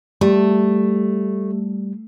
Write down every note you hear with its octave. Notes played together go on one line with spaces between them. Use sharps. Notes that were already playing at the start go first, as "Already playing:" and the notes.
G3 A3 G4